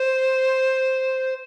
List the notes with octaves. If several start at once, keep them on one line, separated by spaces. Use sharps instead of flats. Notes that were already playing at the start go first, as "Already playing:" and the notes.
Already playing: C5